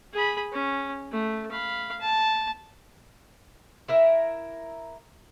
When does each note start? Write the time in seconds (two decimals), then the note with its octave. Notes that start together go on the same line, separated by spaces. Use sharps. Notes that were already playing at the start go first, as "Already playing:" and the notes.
0.13 G#4 B5
0.52 C#4
1.11 A3
1.51 F5 B5
2.00 A5
3.88 E4 A#4 E5